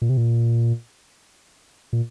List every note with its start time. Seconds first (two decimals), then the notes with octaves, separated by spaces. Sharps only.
0.02 A#2
0.09 C3
0.17 A#2
1.93 A#2